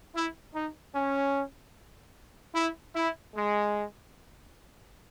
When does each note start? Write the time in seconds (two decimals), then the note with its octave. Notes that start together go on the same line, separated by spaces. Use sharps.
0.13 E4
0.54 D#4
0.93 C#4
2.54 E4
2.95 E4
3.35 G#3